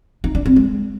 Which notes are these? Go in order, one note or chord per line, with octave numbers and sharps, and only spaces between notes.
D#4
D4
C4
G#3